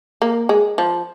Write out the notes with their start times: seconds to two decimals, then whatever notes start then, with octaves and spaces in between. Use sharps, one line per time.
0.22 A#3
0.49 G#3
0.78 F3